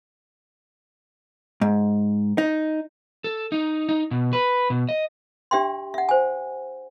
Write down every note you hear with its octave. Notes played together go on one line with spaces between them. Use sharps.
G#2
D#4
A4
D#4
D#4
B2
B4
B2
D#5
D4 G4 E5 G5 C6
E5 F#5
C5 G#5